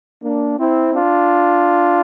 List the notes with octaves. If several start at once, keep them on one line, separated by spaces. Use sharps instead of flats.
A#3 D4
C4 E4
D4 F4